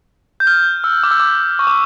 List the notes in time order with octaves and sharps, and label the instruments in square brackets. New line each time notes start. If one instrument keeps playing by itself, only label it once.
[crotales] G6
F6
E6
D6
E6
D6
C#6
D6